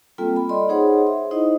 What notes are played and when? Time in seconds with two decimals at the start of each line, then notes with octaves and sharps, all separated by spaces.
0.18 G3 A#3 C4 F4 A4 G5
0.36 B5
0.49 D5 D#5 B5 C6
0.69 D#4 G#4 C5 C#5 F#5 C6
1.07 E5
1.31 D#4 E4 C5 D#5